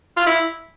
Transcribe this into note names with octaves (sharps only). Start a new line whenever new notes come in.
F4
E4